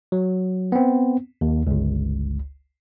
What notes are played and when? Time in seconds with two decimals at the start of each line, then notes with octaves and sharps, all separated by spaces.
0.12 F#3
0.72 B3 C4
1.41 D#2
1.67 G1 C#2